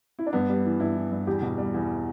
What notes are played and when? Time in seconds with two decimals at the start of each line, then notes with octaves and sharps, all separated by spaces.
0.19 E4
0.26 D4
0.33 G2 B3
0.49 G3
0.65 E3
0.80 G2 E4
0.96 E3
1.11 G2
1.27 E2 G4
1.42 B2
1.58 G3
1.74 E2